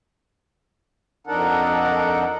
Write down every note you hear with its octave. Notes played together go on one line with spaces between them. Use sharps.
F2 D4 D#4 A4 A#4 F#5